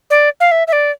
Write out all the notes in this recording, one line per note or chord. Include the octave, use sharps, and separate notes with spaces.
D5
F5
E5
E5
D5